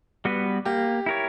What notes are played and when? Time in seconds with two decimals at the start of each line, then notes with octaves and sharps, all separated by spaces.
0.25 G3 B3 F#4 B4
0.65 A#3 G4
1.06 E4 A#4 C#5